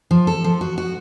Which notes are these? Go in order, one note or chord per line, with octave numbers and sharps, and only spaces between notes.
F3
A4
F3
F#4
F#4